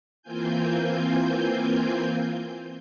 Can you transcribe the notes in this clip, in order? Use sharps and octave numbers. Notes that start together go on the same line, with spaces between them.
E3 A#3 C4 F4 G#5 G6